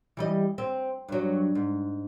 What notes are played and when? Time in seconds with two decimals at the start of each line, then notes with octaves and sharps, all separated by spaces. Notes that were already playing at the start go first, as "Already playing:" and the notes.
0.17 E3 G3 D#5
0.58 C4
1.08 G2 F#3
1.55 G#2